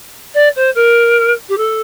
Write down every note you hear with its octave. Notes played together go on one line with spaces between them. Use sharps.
D5
C5
A#4
G4
A4